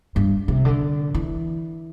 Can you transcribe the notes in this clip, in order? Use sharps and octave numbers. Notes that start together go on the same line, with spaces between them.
G2
C3
D3
E3